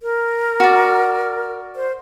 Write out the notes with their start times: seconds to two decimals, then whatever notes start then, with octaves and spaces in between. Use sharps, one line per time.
0.03 A#4
0.60 F#4 D5
1.76 C5